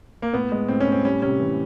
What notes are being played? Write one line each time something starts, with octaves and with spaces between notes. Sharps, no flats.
A#3
A2 B3
G#3
A2 C4
C#4
A2
C4
G3 C#4
C3 C#4
E3